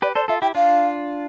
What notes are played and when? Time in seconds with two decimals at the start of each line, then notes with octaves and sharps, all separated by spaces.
0.02 G4 B4 D5
0.15 A4 C5 D5
0.28 F4 A4 E5
0.42 E4 G4 G5
0.55 D4 F4 F5